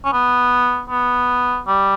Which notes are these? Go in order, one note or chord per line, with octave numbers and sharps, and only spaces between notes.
C#4
B3
B3
G3